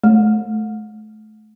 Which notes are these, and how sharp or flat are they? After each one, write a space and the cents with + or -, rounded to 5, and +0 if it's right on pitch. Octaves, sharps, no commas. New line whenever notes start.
A3 -30